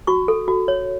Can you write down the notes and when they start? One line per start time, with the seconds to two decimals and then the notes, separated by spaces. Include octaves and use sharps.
0.07 F#4 C#6
0.28 A4
0.48 F#4
0.68 C#5